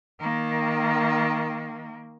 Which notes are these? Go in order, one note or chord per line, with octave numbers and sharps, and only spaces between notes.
D#3 A#3